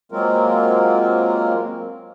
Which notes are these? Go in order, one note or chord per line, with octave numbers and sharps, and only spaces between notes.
F#3 G#3 A#3 C4 F4 A#4